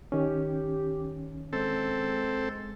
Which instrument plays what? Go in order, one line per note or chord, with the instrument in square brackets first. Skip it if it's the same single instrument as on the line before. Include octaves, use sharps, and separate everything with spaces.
[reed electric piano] D#3 C#4 [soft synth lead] G4
[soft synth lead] G#3 [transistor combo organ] C4 A4